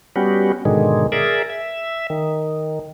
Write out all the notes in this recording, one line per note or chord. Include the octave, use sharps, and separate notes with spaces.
G3 B3 C#4 F#4 G4
G#2 B2 D3 D#3 G#3
G#4 A#4 D5 E5
E5
D#3